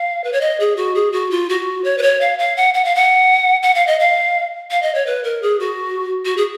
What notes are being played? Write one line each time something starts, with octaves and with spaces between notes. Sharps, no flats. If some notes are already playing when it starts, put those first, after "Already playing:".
Already playing: F5
B4
C#5
D#5
G#4
F#4
G#4
F#4
F4
F#4
C#5
B4
C#5
F5
F5
F#5
F#5
F5
F#5
F#5
F5
D#5
F5
F5
D#5
C#5
B4
A#4
G#4
F#4
F#4
G#4